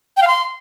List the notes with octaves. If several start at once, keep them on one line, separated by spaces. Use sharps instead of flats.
G5
F5
C6